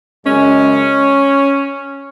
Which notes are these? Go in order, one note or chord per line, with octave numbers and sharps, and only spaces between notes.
F#2 C#3 G#3 C#4